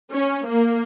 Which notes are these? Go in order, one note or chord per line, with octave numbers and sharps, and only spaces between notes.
C#4
A#3